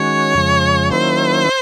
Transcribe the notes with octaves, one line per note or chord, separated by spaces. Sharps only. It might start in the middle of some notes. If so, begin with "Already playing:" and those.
Already playing: D#3 G#3 C#4 F#4 C#5
F2 C#3 F3 G#3
D#3 F#3 A#3 C#4 E4 C5